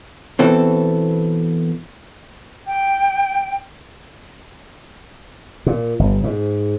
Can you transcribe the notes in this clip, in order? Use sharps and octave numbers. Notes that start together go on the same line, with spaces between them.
B2 E3 C4 A4
G5
A#2
G1
G#2